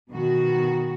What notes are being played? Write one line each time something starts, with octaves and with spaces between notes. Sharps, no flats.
B2 D#3 F#4